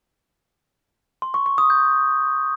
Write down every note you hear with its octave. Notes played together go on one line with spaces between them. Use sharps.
C6
C#6
C#6
D#6
G6